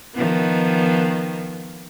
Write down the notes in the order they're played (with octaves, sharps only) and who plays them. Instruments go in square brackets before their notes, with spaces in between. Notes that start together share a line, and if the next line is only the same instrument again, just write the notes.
[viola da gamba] D#3 F3 B3